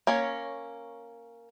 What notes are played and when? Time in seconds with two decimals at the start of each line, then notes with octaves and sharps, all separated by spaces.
0.07 A#3 C#4 C#5